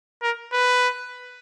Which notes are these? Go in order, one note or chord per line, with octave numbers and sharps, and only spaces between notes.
A#4
B4